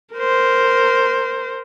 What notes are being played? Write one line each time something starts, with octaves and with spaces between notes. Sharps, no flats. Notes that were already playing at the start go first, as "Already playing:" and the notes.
A#4 C5